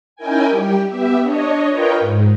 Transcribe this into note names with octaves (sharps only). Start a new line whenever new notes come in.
C#4 D#4 E4 A#4 G5 G#5
G3 G4
B3 G4 E5
D4 C#5 D#5
F4 A#4 B4 C#5 D#5 G5
G#2